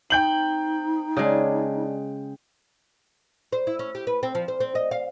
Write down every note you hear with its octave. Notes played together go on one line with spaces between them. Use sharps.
C4 D#4 G5 G6 F#7
C#3 G#3 D4 G#5 A5
C5
E4
C#4
G4
B4
C4
F3
C5
C4
D#5
F5